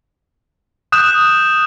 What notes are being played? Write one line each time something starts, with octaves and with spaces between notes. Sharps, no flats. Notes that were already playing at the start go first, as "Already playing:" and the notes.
D#6 F#6 G6 E7